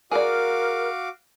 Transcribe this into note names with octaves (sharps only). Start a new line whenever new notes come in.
F#4 G#4 A#4 D5 F5 D6